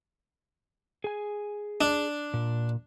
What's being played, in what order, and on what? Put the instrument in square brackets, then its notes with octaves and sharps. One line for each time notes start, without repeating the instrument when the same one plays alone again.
[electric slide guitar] G#4 G#5
[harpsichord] D4
[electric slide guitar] A#2